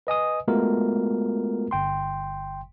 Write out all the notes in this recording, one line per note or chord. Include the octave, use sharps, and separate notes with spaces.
B4 D#5 G#5 D#6
G#3 A3 B3 F4 F#4 A#4
G1 G5 C6